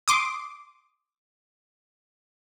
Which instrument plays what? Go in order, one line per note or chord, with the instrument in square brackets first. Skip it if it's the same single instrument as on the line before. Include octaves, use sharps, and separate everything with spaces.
[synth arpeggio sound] C6 D6 D#6